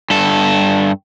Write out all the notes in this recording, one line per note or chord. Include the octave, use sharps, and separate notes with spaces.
G2 A4